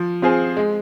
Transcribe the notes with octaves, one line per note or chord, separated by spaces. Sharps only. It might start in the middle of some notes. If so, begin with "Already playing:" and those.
Already playing: F3
C4 F4 G#4 C5
G#3